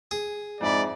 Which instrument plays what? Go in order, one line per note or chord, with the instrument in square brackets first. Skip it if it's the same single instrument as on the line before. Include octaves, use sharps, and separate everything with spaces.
[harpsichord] G#4
[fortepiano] F2 E4 B5 [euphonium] G#2 [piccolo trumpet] D5